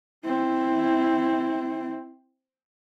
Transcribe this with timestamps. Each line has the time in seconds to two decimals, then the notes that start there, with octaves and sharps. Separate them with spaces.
0.24 C4 E4